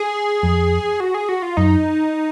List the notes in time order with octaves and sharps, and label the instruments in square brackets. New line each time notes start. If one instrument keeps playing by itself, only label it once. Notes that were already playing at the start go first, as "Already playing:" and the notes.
Already playing: [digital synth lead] G#4
[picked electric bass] F2
[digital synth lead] F#4
G#4
F#4
F4
[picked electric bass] F#2 [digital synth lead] D#4